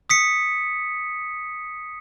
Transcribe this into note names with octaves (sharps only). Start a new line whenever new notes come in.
D#6 B6 C#7